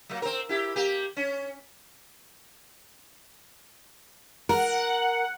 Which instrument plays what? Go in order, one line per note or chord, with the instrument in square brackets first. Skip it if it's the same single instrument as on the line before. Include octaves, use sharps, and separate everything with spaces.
[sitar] F#3 G#3 A#3
C4 A#4
E4 G4
A#3 G4
C#4
[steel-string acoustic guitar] A#4 [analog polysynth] F#5